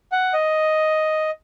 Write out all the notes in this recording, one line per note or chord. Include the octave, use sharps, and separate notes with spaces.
F#5
D#5